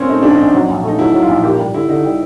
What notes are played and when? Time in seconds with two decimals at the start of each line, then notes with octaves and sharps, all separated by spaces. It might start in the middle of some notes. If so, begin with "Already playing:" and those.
Already playing: A#2 C4 C#4
0.09 A3 D#4
0.23 A#1 D4
0.35 A#1 D#4
0.54 F#3
0.68 A#1
0.84 A3 D#4
0.99 F#3 E4
1.13 F#3
1.22 F4
1.28 A#1
1.43 A#3 G4
1.59 G3
1.74 D3 E4
1.88 D3 D#4
2.04 G3